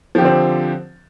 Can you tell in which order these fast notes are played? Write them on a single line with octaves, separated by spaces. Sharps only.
F3 G4 D3 C4